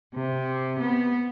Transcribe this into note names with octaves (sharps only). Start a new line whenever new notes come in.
C3
B3